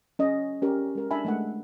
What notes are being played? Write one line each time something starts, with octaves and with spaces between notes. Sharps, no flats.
C#4 D#5
C#4 G4 A#4
G#3 A#4
D4 E5 G#5 A5 B5
G#3 A3 F#5